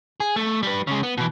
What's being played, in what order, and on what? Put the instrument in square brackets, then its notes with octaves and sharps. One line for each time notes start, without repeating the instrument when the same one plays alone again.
[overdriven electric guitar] G#4
A3
G3 B4
C#3 G#3
B3
B2 E3